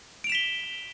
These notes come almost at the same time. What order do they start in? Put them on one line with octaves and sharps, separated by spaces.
D7 F7 E7 B6 G7